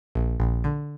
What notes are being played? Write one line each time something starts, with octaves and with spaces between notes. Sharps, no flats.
A#1
A#1
D3